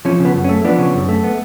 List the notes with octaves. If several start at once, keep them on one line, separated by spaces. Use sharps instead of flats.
F3 C#4
C#3
B3
F#2
C#4
A3
F3 B3 D4
C#3
F#2
A3
B3